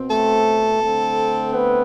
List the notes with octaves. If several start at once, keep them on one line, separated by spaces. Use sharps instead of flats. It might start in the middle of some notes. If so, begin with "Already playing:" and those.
Already playing: B2 C4
A3 A4
D3 A3 C4
B3 B4